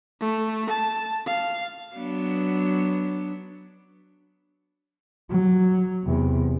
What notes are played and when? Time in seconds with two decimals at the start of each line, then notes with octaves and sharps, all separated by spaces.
0.21 A3
0.70 A5
1.27 F5
1.95 F#3 B3 D4
5.30 F#3
6.03 E2 C3